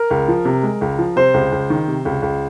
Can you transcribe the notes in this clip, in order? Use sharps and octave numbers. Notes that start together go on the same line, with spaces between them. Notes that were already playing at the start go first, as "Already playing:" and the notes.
Already playing: A#4
C#2
F3
C3
G#3
C#2
F3
C3 C5
C#2
C#2
D#3
C3
C#2
C#2